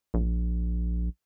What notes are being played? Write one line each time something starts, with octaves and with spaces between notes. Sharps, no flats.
A#1